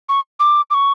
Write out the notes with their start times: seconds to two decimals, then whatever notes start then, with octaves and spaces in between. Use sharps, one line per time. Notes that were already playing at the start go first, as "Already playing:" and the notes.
0.09 C#6
0.40 D6
0.70 D6
0.74 C#6